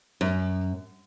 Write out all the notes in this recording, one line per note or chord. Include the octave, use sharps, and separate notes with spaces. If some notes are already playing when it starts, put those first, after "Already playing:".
F#2